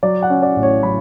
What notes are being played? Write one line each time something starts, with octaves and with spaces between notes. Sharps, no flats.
F#3 D5
F#5
C#4
D5
A1
C#5
F#3 B5